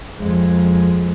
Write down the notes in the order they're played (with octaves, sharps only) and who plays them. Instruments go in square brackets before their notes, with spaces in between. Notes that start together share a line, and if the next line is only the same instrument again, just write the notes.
[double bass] F2 G#3